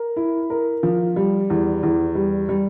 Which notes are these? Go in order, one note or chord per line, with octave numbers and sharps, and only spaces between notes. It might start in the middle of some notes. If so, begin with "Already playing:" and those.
Already playing: A#4
E4
A#4
F3
G3
E2
E2
G3
G3